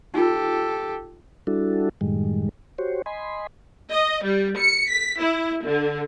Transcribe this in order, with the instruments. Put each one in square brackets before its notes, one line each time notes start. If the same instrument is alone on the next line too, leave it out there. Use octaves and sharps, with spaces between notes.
[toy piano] D#4 F4 [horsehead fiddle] G4 A4
[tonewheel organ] G3 D4 E4 F#4 A4
F#2 A2 D#3 G3 G#3
F#4 G4 C5 C#5
D#5 G#5 B5 C6
[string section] D#5
G3
C#7
B6
E4
D3